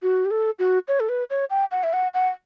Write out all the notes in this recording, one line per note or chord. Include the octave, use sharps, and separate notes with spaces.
F#4
G4
A4
F#4
C#5
A4
B4
C#5
G5
F#5
E5
F#5
F#5